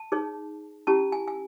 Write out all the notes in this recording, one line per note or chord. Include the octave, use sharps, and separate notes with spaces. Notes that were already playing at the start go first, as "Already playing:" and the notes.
Already playing: A5
D#4 G#4 C#5
C#4 E4 G4 A5
G#5
G#5